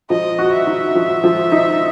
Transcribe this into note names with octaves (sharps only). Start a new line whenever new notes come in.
F3 D#5
F#4
E5
D#4
F3
F3
D#4